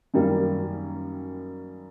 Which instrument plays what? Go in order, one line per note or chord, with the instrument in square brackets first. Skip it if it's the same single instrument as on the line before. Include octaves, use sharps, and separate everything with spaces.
[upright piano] F#2 D#3 G3 A#3